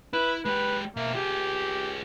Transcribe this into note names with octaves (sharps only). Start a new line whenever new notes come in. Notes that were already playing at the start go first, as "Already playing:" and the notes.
E4 B4
G#3 G4 B4
B2 A#3 E5
F4 G4 G#4